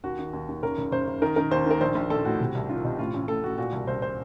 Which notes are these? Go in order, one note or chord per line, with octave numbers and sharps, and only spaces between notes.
D#2 F#4
D#3
D#2
D#2
F#1 A#4
F#1
F#1 C5
F#1
D#3 A#4
D#3 A#4
D#2 C5
D#3 A#4
A#1 C5
A#1
A#1 A4
A2 F#4
C3
C2
D#3 F4
C3 D#4
A2 F4
A1
A2 A4
A2 F#4
A#2 F#4
C2
C2 C5
C5